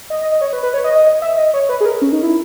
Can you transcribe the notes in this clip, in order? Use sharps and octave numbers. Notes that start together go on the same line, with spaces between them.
D#5
D#5
D#5
C#5
B4
B4
C#5
D#5
D#5
D#5
E5
D#5
C#5
B4
G#4
A#4
C#4
D#4
E4